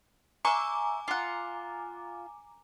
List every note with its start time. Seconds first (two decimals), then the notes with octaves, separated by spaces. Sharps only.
0.45 E5 G#5 A#5 C#6 D6
1.08 F4 F#5